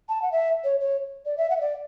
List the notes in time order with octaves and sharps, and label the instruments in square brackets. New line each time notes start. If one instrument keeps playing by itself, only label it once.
[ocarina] A5
F#5
E5
C#5
C#5
D5
E5
F#5
E5
D5